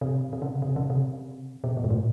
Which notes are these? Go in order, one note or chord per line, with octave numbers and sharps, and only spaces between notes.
C3
C3
C#3
C3
C#3
C3
B2
A#2
G#2
A2